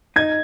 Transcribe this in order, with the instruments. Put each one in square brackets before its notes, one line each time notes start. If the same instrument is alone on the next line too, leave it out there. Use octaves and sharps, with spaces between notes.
[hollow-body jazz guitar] D#4 [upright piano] G#6